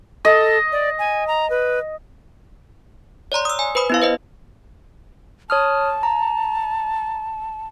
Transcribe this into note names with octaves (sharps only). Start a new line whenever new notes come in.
A4 D#5
D5
G#5
A#5
B4
C#5 D5 A#5 C6
D#6 E6
G#5
B4 C5 B5 D#6
B3 E4 F5
B4 C5 D#5
C#5 A5 D#6 F6
A#5